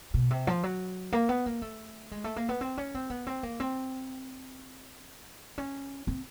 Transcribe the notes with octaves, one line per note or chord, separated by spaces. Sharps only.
B2
C3
F3
F#3
A#3
B3
A#3
A3
G#3
A3
A#3
B3
C4
C#4
C4
B3
C4
A#3
C4
C#4
C4